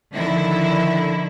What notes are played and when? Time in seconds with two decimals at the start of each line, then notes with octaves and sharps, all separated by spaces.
0.13 D3 D#3 F3 E4